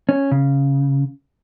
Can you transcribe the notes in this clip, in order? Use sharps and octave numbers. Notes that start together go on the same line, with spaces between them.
C#4
C#3